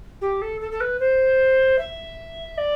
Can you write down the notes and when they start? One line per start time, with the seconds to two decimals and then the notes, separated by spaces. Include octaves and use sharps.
0.21 G4
0.41 A4
0.61 A4
0.71 A4
0.80 B4
0.99 C5
1.78 E5
2.57 D5